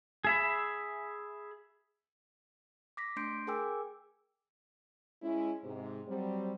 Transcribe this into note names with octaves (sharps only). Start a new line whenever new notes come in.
G#4 E5 B5
D6 A#6 B6
A3 D4 C6 G6 C7 D7
G#4 A#4 G5 G#5 D6 E6
G#3 C#4 E4
G#2 C3
F#3 G3 C4